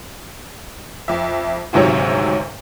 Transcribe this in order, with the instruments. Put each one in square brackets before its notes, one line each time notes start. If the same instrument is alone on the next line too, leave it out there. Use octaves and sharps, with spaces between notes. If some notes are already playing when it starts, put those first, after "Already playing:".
[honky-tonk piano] F2 E5
G#1 D2 G#2 C3 F#3 C#5